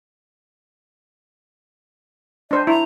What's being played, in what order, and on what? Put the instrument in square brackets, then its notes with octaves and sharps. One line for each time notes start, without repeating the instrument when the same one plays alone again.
[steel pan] D4 C5 [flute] D#5
[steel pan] E4 [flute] A#5